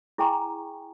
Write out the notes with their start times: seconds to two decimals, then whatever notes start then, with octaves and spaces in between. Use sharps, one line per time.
0.18 E4 G#4 G5 G#5 A#5 C#6